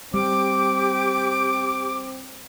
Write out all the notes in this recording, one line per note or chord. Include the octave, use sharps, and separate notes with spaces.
G3 C4 G4 D6